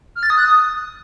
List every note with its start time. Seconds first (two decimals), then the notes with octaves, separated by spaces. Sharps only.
0.15 F6
0.23 A6
0.30 D#6
0.37 F#6
0.45 D#6